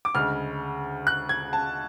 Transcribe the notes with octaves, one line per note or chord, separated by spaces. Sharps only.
D6
D2 C#3 G#3 F6
F#6
G#6
A5